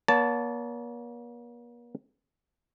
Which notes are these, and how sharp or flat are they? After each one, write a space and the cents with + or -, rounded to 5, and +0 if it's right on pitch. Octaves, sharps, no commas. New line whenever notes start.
A#3 +45 C#5 +45 A5 +0